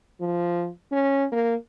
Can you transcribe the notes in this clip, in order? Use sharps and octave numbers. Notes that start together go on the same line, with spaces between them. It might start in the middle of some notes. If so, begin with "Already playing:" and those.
F3
C#4
A#3